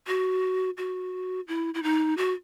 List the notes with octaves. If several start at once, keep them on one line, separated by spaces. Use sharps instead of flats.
F#4
F#4
E4
E4
D#4
F#4